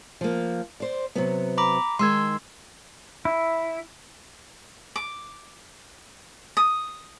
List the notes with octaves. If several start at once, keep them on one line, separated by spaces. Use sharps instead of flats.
F3 A#3
C5 D5
C3 F#3 B3
A#5 B5 D6
D#3 G#3 C6 E6 G#6
E4
D6
D#6